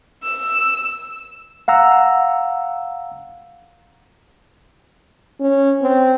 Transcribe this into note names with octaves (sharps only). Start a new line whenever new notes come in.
E6
F5 F#5 A#5 E6
C#4
C4